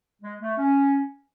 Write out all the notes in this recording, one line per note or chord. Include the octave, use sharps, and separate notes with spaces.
G#3
A3
C#4